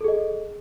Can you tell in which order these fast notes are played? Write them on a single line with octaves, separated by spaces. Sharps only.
A4 G#4 D#5